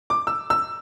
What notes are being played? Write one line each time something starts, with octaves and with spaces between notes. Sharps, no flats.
D6
E6
E6